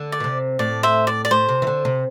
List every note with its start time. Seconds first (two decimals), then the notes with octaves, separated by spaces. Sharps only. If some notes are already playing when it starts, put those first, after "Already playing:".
Already playing: D3
0.12 D5
0.20 B2
0.24 C3
0.59 A2 D5
0.83 C5 E5
1.07 D5
1.25 D5
1.31 A2 C5
1.49 C3
1.62 E3
1.67 D3
1.85 C3